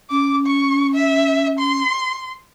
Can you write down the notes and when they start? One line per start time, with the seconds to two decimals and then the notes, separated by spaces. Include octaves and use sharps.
0.11 C#4 D6
0.46 C#6
0.95 E5
1.59 C6